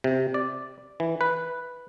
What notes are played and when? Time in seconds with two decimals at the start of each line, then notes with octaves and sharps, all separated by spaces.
0.04 C3
0.34 D5
1.00 E3
1.21 B4